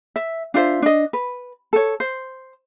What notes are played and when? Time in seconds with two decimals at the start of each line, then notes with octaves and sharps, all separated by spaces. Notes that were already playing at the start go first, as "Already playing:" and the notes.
0.16 E5
0.54 D4 F4 C5 E5
0.82 D4 D#5
1.13 B4
1.73 A4 C#5
2.00 C5